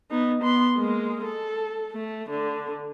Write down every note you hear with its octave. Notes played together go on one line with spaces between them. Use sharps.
B3 D#4
B3 C6
G#3 A#3
A4
A3
D3